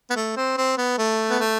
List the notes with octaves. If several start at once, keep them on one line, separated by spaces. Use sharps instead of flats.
B3
A3
C4
C4
B3
A3
B3
A3